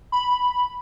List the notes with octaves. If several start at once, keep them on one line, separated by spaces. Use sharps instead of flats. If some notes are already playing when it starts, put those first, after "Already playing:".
B5